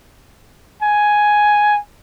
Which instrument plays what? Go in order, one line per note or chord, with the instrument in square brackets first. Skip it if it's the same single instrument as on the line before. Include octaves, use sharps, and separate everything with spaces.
[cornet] G#5